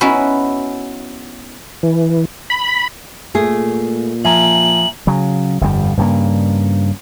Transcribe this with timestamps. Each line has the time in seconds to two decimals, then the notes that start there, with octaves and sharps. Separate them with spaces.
0.01 B3 C#4 D#4 E4 F#4 B4
1.83 E3
2.50 B5
3.35 A#2 A3 G#4
4.25 F3 E5 G#5 A#5 F#7
5.07 C#3 F#3
5.61 G1 F2 G3
5.97 G2 C#3 A#3